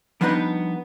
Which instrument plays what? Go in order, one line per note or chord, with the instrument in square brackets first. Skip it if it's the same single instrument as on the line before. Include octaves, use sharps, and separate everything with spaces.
[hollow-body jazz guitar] F3 G3 B3 D4 D#4 B4